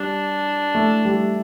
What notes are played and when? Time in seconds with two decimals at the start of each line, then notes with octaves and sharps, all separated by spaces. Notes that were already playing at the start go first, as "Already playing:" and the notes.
Already playing: G3 D4
0.75 A3
1.05 G3